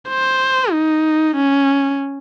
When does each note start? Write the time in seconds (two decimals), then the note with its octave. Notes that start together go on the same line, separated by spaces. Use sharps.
0.09 C5
0.72 D#4
1.36 C#4